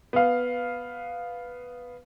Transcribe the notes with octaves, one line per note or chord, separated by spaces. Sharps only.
B3 F5